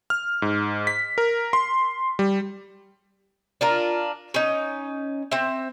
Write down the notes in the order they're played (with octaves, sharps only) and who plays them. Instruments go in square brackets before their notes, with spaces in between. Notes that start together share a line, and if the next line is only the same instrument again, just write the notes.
[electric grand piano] F6
G#2
B6
A#4
C6
G3
[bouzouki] D4 F4 A#4
C#4 D#4
C4 E5